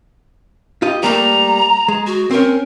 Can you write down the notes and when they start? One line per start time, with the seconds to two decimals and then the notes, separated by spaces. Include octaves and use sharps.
0.82 F4 G4 D#5
1.03 G3 A3 A#3 A#5
1.88 G#3
2.07 F#4
2.31 C4 C#4 A#4